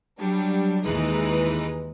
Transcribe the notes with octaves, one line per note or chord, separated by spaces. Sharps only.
F#3 G3 D4
D#2 E3 G#3 D#4 B4